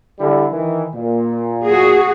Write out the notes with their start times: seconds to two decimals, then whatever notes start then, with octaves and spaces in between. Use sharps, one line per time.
0.18 D3 G3 E4
0.51 D#3 E3
0.93 A#2
1.65 F#4 G#4